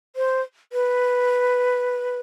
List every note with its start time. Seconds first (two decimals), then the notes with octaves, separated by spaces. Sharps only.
0.16 C5
0.73 B4